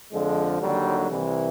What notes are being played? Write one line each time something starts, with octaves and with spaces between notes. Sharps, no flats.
F2 D3 F3 G#3
D#2 D3 F#3 G3
C2 C3 E3